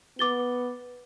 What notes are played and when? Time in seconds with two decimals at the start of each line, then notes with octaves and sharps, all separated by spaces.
0.19 B3 D6 A6 G7